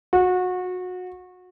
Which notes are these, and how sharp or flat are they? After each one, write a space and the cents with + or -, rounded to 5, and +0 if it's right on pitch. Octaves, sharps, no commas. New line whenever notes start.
F#4 -25